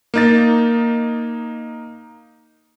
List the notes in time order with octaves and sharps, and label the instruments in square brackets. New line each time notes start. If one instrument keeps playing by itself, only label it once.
[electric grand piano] A#3 D#4 A6